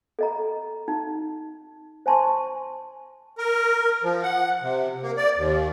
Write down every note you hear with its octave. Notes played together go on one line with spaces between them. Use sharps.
A4 D#5 A#5
D#4
C5 G#5 A5 C6 C#6
A#4
F3
F#5
C3
A#3
D5
D#2